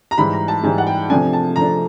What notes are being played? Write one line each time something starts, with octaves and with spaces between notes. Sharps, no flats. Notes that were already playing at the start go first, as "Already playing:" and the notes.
A#5
G#2 E3 G3 B5
A#5
A5
G#2 E3 G3 G#5
F#5
G5
C3 F3 A3 D4 G#5
A5
C3 F3 A3 D4 A#5